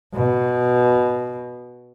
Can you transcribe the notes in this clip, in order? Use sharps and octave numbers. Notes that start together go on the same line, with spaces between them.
B2